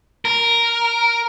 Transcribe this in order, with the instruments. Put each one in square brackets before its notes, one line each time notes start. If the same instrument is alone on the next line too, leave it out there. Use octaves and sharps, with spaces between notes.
[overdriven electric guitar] A#4